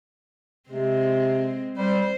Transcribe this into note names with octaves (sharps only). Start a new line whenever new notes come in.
C3 G#3 C4
G3 C5